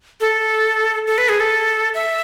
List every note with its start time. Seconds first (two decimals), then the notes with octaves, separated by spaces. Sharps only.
0.21 A4
1.07 A4
1.18 B4
1.29 G#4
1.40 A4
1.94 E5